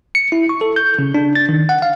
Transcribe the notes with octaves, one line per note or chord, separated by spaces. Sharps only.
C#7
E4
C#6
A4
G6
C#3
D4
A6
D#3
F#5
F5